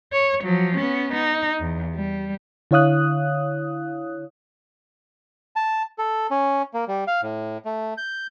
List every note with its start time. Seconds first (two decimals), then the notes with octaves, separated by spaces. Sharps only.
0.13 C#5
0.44 F3 F#3
0.77 B3 C#4
1.15 D#4
1.60 E2
1.95 G3
2.71 D3 E4 C#5 F5 D#6 F#6
5.56 A5
5.99 A4
6.31 C#4
6.74 A#3
6.88 G3
7.08 F5
7.22 A2
7.65 A3
7.97 G6